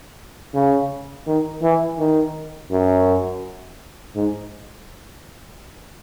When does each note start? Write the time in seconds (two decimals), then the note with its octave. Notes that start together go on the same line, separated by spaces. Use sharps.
0.54 C#3
1.27 D#3
1.62 E3
1.99 D#3
2.71 F#2
4.15 G#2